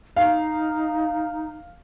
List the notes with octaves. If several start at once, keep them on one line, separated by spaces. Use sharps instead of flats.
D#4 F5